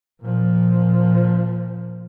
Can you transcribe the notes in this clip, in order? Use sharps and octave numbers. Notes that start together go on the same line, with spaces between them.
A#2 F3